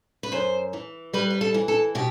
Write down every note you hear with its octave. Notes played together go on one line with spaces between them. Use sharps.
B4
F#2 C5
E3
G3 B4
B4
A4
E3
A4
B2 G4